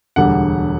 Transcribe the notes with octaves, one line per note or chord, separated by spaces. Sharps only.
E1 D2 D3 G3 F#5